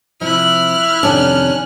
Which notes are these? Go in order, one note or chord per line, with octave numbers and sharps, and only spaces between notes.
C3 F3 E4 F6 F#6
F2 C3 D#3 C#4 D4